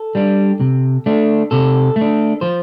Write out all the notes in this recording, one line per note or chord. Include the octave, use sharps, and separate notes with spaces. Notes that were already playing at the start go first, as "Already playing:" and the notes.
Already playing: A4
G3 D4
C3
A3 D4
C3 A4
A3
D4
F3 C5